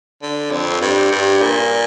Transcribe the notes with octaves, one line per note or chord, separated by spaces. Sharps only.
D3
F2
G2
G2
A#2